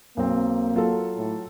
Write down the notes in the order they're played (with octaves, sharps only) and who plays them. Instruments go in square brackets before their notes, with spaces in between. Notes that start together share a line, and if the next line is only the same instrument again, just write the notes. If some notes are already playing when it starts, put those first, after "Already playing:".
[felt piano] B1 C4 [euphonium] A#3
[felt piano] F#3 F4 A4
[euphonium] A2